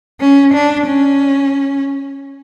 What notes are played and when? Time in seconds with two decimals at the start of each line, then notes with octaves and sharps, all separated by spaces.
0.21 C#4
0.54 D4
0.87 C#4